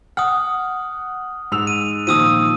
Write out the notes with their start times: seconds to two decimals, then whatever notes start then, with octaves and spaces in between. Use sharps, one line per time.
0.17 F#5 D#6 F6
1.52 G#2 E6 F7
1.67 D#7
2.07 A#2 D#3 F3 D#6 E6 D#7